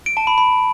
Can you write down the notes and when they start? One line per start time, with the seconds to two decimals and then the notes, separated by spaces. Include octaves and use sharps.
0.06 D7
0.17 A5
0.27 B5
0.38 B5